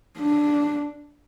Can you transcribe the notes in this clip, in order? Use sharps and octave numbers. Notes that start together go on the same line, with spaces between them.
D4